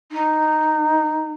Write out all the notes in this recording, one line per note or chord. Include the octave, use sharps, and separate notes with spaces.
D#4